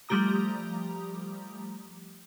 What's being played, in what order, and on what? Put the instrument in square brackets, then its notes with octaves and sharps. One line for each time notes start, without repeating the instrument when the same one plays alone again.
[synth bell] F3 G3 A3 G4 A#5 D#6